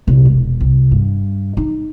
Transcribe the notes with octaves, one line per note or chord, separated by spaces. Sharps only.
C2 A#2
E1
C2
G2
D#4